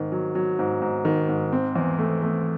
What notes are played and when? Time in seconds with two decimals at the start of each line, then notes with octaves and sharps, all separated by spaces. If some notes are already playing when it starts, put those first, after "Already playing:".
Already playing: G#2 D#3
0.12 F#3
0.35 F#3
0.59 G#2
0.82 G#2
1.05 D#3
1.29 G#2
1.52 C4
1.76 E2
1.99 A3
2.22 A3